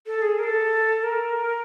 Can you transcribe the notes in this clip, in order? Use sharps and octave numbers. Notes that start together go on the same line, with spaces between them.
A4
G#4
A#4
A4
A#4